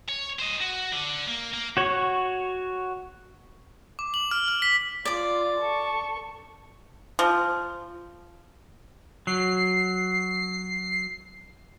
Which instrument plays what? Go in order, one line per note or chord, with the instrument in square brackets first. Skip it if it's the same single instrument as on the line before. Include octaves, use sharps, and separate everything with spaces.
[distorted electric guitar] C#5
C5 D#5
F#4
D3
A#3
A#3
[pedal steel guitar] F#4 C#5
[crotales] D6
F#7
F6
F6
B6
[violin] F4 [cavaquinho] D5 D6
[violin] A4 C#6
[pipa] F3
[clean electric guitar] F#3 [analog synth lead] C7